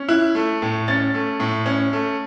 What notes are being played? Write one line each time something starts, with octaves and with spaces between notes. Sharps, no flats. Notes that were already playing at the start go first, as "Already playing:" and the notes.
Already playing: C#4
E4 F#6
A3
A2
C#4 A6
A3
A2
C#4
A3